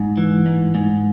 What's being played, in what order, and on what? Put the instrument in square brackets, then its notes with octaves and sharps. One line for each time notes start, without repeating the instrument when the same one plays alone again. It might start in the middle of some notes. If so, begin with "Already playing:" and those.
Already playing: [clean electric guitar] G#2
E3
G#2
G#2